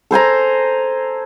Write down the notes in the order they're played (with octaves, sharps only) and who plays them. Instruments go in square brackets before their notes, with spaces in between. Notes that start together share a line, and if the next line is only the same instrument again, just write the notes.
[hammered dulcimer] A4 C5 G#5 A#5